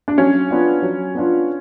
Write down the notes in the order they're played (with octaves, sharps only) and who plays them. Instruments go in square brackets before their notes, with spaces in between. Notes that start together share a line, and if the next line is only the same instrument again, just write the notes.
[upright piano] D4
[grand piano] F#3 [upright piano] C#4
[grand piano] B3 D4 F4
F#3
B3 D4 F4